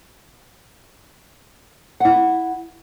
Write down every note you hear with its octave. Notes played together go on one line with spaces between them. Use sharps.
E4 F#5